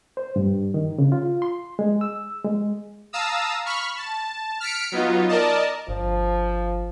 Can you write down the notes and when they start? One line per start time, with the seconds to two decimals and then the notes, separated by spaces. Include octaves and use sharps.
0.17 C5
0.36 G2
0.74 D#3
0.98 C#3
1.12 F4
1.42 C6
1.79 G#3
2.01 E6
2.45 G#3
3.13 F5 A5 A#5 D#6 E6
3.66 B5 C#6 F6
3.97 A5
4.60 F6 B6 C#7 D7
4.92 F#3 B3 D#4 F4
5.29 A#4 D5 D#5 A5
5.88 G1 F3